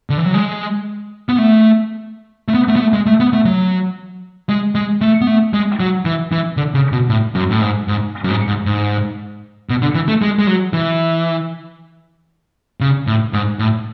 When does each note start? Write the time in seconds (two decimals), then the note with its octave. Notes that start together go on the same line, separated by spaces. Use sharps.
0.10 D3
0.18 E3
0.26 F#3
0.34 G#3
1.29 B3
1.38 A3
2.48 A3
2.54 B3
2.68 A3
2.76 B3
2.81 A3
2.93 G#3
3.06 A3
3.20 B3
3.33 A3
3.45 F#3
4.49 G#3
4.75 G#3
5.01 A3
5.21 B3
5.27 A3
5.53 G#3
5.80 F#3
6.05 E3
6.32 E3
6.57 D3
6.74 C#3
6.92 B2
7.09 A2
7.35 F#2
7.51 A2
7.61 G#2
7.88 G#2
8.24 F#2
8.30 G#2
8.47 G#2
8.66 G#2
9.70 B2
9.82 D3
9.95 E3
10.08 A3
10.22 G#3
10.39 G#3
10.47 F#3
10.73 E3
12.81 C#3
13.07 A2
13.33 G#2
13.59 A2